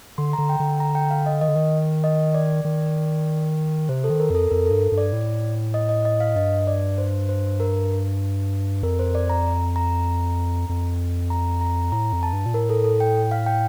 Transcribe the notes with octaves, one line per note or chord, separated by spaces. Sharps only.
D3 C6
A#5
D3
G5
D3
A#5
G5
F5
D#5
D#3 D#5
D3
D#3
D#5
D5
D#3
C3 C5
A4
D#3
A#4
F2 A4
F2 A#4
G2 A4
G2
D5
A2
D#5
D#5
D#5
F5
G2 D#5
D5
C5
C5
A#4
F2 A#4
C5
D5
A#5
A#5
F2
A#5
A#5
A2 A#5
F2
A5
G2
A#2
A2 A#4
A4
A4
G5
F5
G5